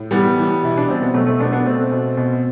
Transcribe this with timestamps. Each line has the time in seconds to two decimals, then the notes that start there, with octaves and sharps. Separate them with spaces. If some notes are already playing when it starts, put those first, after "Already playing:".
Already playing: A2
0.11 E3 G3 B3
0.37 E3
0.63 B2 E4
0.78 D4
0.88 B2 C4
1.02 B3
1.14 B2 F#3 A3
1.26 A3 C4
1.39 B2 B3 D4
1.52 B3 D4
1.66 B2 A3 C4
1.91 B2
2.17 B2